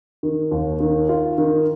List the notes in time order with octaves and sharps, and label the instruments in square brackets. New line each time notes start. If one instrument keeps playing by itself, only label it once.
[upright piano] D#3
D#2
D#3
F4
D#3